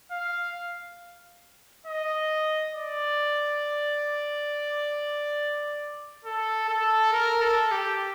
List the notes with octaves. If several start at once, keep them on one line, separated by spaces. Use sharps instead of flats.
F5
D#5
D5
A4
A4
A#4
A4
G4